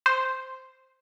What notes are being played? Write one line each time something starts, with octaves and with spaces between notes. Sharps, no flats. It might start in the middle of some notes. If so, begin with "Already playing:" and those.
C5